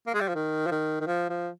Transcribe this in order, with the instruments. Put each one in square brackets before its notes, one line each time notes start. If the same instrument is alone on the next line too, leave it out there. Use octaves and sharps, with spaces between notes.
[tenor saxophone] A#3
G#3
G3
F3
D#3
F3
D#3
D#3
F3
F3